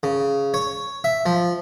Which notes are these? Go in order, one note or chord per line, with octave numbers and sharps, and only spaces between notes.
C#3
C#5
E5
F3